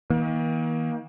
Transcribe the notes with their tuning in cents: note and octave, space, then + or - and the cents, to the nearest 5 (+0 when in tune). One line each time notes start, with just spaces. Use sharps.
D#3 +45 A#3 +35